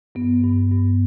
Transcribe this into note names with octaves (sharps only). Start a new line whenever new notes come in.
G2 B3
G2
G2